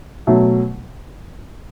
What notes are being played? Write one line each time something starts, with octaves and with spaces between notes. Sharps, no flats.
B2 F#3 A3